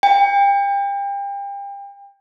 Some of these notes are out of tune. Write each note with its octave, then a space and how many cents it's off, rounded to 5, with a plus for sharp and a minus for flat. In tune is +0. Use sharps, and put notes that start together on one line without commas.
G5 +35